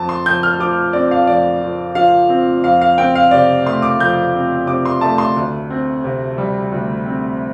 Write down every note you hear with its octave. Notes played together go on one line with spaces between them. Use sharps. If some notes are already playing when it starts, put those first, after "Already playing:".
Already playing: F2 A5
C6
F2 G6
F6
F3 D6
C4 D5
F5
F2 D5
F2
F3 F5
C4
F2 F5
F5
C4 G5
F5
C3 D5
A3 C6
D6
F2 G6
C4
C3 D6
C6
A3 A5
C6
D2
C4
C3
G3
D2
C4